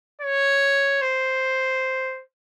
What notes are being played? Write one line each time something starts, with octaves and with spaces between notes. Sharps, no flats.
C#5
C5